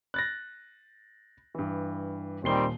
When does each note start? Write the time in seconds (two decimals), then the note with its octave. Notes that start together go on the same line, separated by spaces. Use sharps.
0.14 F#6 A6 A#6
1.55 G2 E3
2.44 D#1 D#3 G3 C4 C7 G7